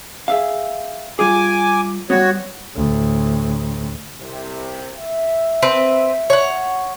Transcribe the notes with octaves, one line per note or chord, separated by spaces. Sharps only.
G#4 E5 F5
G3 F4 G#4 G#5 D6
G3 B3 F#4 C#5
D2 A2
C2 C3
E5
C4 B4
C#5 F#5